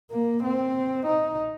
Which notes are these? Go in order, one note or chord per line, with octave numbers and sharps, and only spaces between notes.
A#3
C4
D#4